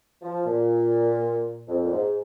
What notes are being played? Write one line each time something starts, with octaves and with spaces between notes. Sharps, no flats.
F3
A#2
F2
A#2
G#2